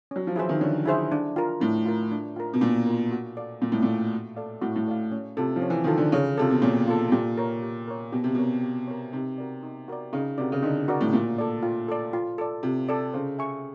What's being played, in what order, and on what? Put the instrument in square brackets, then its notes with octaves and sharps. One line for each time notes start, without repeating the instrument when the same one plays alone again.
[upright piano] F#3 [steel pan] C#4
[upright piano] F3
[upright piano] E3 [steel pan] E4 G#4 C5 E5
[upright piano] D#3
[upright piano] D3 [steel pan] C#4
[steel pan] E4 G#4 C5 E5
D4
F4 A#4
[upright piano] A2 [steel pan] D4
[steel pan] F4 A#4
D4
F4 A#4
[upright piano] B2
[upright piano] A#2 [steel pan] D4
[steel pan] F4 A#4
F#4
A4 D5 F5
[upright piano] A#2 [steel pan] F#4
[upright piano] A2
[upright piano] A#2 [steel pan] A4 D5 F5
[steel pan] F#4
A4 D5 F5
[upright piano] A2 [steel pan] F#4
[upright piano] A2
[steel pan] A4 D5 F5
C#4
[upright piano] C3 [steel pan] F4 A4
[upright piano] F3
[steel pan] C#4
[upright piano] E3
[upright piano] D#3 [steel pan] F4 A4
[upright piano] D3
[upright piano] C#3 [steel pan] C#4
[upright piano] C3 [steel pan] F4 A4
[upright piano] B2
[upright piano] A#2 [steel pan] C#4
[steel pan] F4 A4
[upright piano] A#2 [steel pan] G4
[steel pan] A#4 C#5
G4
A#4 C#5
[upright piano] B2 [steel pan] G4
[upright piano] C3
[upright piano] B2 [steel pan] A#4 C#5
[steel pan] G4
A#4 C#5
[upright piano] C3 [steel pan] D#4
[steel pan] F#4 A#4 D5
D#4
F#4 A#4 D5
[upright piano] C#3 [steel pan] D#4
[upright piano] C3 [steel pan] F#4 A#4 D5
[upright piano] C#3
[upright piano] D3 [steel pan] D#4
[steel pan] F#4 A#4 D5
[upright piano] A2
[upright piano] A#2 [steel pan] F4
[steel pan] A4 D5
F4
A4 D5
F4
A4 D5
[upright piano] C3 [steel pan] F4
[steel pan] A4 D5
[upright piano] C#3 [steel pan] C5
[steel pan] E5 G#5 C#6